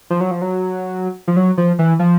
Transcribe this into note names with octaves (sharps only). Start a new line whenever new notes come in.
F3
F#3
F3
F#3
F3
F#3
F3
E3
F3